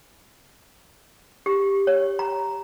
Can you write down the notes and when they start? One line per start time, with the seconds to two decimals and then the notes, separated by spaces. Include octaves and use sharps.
1.46 G4
1.87 C#5
2.19 A#5